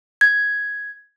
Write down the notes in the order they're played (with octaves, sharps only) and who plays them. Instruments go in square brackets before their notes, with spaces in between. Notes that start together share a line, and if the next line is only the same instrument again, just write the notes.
[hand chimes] G#6